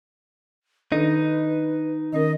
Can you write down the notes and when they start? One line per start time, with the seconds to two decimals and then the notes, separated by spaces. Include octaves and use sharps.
0.92 D#3 D4 D#4 A4 B4
2.13 D#3 C#4 A#4 D#5